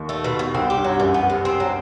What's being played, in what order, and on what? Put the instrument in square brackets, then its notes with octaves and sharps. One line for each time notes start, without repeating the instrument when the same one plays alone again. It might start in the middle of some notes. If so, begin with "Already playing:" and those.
Already playing: [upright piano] D#2 D#3
[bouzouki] A3
B2
B2
[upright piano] C2 C3 [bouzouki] C4
[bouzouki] G4
[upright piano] G2
[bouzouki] F#3
[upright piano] F#2 [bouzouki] E3
[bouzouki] B3
C3
C4
F#3